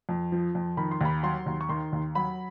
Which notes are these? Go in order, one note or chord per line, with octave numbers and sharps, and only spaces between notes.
F2
F3
F2
D#3 B5
C6
D#2 B5
F#3 C6
D#2
C#6
D#3 C6
D#2
F#3 B5